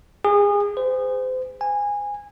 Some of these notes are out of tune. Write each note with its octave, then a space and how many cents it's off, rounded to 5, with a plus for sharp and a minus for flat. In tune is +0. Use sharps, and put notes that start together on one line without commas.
G#4 -30
C5 -35
G#5 -20